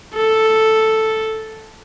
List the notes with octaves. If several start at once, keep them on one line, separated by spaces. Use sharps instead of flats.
A4